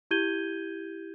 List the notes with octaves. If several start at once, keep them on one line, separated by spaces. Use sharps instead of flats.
E4 G4 G6 G#6 D#7 G7